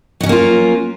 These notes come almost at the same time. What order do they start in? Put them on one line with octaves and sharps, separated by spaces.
F#3 D#4 C#4 A#3 F4